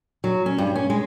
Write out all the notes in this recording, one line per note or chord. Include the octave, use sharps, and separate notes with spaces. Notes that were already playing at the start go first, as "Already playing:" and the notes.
F#3
C#4
G2
C#4
G#3